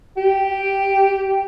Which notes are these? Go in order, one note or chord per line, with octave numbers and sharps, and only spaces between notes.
G4